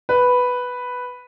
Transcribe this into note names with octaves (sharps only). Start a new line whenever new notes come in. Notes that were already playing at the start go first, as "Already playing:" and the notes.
B4